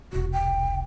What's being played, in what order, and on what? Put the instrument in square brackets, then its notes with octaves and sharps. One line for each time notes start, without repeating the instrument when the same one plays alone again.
[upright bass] E1 C2 [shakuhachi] F#4
[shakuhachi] G5